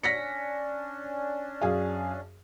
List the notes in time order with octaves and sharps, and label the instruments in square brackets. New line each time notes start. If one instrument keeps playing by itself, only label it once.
[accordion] C#4 D4 [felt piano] A#6 B6 C#7
[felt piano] F#2 G#4 F5